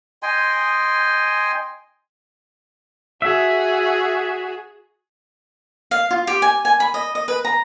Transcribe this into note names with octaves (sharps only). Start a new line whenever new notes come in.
D#5 G5 G#5 C6
F#4 G#4 E5
F5
F4
G4
G#5
G#5
B5
D#5
D#5
B4
A#5